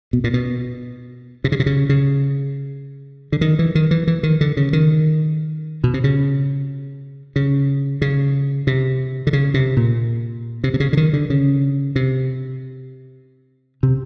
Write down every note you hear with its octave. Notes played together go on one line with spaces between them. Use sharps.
B2
A#2
B2
C3
C#3
C3
C#3
C#3
D3
D#3
E3
D#3
E3
E3
D#3
D3
C#3
D#3
B2
C3
C#3
C#3
C#3
C3
D3
C#3
C3
A#2
C3
C3
C#3
D3
D#3
D3
C#3
C3
C3